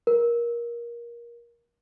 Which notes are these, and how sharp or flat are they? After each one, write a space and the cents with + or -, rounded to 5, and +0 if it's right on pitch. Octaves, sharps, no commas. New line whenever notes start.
A#4 +20